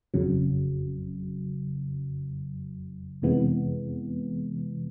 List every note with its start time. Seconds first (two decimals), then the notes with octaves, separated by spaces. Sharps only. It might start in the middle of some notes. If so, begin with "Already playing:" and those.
0.14 G1 F2 C#3 F#3
3.22 F2 C3 E3 G#3 B3